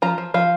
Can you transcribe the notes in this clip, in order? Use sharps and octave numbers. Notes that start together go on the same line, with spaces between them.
F3 A#5
F3
F3 F5